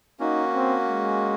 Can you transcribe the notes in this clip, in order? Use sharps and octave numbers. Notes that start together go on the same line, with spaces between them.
A#3 C#4 D#4 F#4
C4
G#3